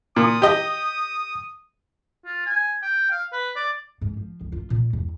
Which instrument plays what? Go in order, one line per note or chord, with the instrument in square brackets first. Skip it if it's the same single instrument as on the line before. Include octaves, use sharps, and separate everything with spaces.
[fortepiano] A#2 [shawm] D#6
[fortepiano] G4 D#5
[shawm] F4
G#5
G5
F5
B4
D5
[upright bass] G#2
F3
C#2
F4
A#2
E2